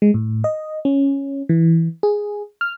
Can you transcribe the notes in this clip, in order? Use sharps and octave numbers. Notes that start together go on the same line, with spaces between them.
G#3
A2
D#5
C#4
E3
G#4
F6